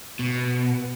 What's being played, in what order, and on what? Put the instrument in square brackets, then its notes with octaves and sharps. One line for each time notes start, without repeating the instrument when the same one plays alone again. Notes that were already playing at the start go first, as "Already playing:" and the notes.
[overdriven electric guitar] B2